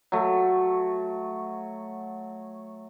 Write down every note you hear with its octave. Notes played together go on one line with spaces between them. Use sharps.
F#3 A3